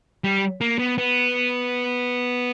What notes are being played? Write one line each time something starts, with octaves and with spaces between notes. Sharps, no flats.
G3
A#3
B3
B3